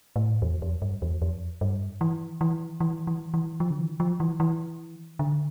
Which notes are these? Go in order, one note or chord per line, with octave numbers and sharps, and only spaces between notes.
A2
E2
F2
G2
E2
F2
G2
E3
E3
E3
E3
E3
F3
D3
E3
F3
E3
E3
D3